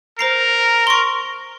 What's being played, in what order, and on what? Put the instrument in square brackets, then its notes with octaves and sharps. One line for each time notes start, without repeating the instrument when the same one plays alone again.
[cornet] A#4 [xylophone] C5 A#5 C7
[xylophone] C6 C#6